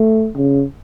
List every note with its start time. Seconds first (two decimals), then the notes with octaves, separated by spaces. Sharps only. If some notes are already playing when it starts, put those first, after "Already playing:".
Already playing: A3
0.36 C#3